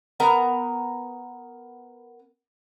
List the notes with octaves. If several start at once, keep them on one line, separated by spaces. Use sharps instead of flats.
B3 A#4 A#5